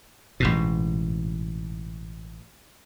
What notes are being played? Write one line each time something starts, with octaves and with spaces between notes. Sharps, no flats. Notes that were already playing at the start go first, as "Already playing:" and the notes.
A1 G#2 B2